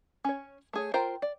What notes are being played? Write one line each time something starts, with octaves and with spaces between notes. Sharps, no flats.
C#4 C#5
A3 G#4 C#5
F4 A#4 C5 G5 A#5
D5